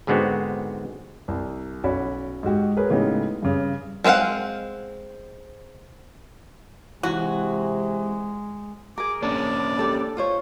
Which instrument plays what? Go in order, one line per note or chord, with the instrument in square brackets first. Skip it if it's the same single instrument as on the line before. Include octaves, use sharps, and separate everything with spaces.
[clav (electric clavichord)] G#2 D3 G#3 B3 C4 F#4
[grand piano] C2
B1 C#4 F#4 D5 B5
G#2 G#3 F#4 G4
G#4 A#4 B4 C#5
A2 C#3 G#3 B3 D#4 G4
G2 C#3
[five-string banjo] G#3 C4 B4 F5 F#5
[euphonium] C3 [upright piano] E3 [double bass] G#3 [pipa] F#4
[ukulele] G#4 A#4 [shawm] D6
[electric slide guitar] A#3 C#4 D4 [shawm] D5
[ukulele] G4 A4
F4 C5 C#5